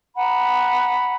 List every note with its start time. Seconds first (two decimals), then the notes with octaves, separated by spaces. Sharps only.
0.16 F#5 A#5 B5